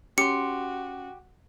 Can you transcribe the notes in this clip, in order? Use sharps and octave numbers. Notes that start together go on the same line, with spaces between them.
C#4 F#4 G4 C6 C#7